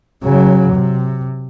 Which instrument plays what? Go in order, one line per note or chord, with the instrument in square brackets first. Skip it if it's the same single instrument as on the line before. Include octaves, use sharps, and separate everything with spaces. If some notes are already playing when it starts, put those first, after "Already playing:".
[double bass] C#3 F#3
C3